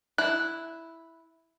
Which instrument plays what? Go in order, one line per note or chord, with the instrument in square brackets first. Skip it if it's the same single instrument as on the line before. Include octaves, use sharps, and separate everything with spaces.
[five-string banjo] E4 [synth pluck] F#6